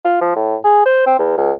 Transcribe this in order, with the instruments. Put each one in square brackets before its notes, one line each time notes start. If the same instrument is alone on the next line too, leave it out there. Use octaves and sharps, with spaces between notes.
[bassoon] F4
F3
A2
G#4
C5
C4
E2
C#2